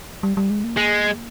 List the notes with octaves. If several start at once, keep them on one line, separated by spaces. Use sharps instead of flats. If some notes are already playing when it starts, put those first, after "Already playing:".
G3
G3
G#3
A#3
G#3